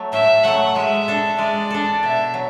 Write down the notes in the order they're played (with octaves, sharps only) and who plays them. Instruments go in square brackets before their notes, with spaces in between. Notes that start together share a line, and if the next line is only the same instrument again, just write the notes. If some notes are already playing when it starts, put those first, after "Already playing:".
Already playing: [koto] F#3 A3
[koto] A2 [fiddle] E5
[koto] F#3 A3 [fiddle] F#5
[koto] G#3 [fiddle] E5
[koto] D4 A4
[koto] G#3 [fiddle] D5
[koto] D4 A4
[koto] B2 [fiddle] E5
[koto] F#3